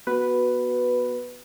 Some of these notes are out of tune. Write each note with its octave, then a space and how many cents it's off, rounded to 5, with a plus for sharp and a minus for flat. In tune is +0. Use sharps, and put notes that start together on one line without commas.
B3 -20 F#4 +0 B4 +0